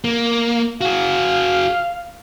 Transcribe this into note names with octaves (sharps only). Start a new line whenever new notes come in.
A#3
F#4 G#4 F5